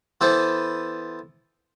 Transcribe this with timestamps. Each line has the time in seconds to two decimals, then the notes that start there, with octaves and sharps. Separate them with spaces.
0.21 E3 B3 A4 C5